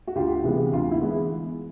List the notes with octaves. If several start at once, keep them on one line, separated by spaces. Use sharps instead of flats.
F#4
D2 F4 G4
C3 E3 G#3 B3
D2 F4
E4
E3 G#3 B3